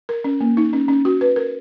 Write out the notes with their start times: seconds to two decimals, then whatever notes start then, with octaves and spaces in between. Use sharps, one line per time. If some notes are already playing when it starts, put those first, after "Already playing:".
0.09 A#4
0.24 C#4
0.41 A#3
0.57 D#4
0.73 C#4
0.88 C#4
1.05 F#4
1.21 B4
1.36 A#4